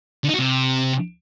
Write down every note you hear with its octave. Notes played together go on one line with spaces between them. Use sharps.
D3
D#4
F#4
C3